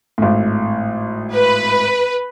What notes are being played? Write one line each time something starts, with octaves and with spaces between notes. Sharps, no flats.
G#1 A2
B4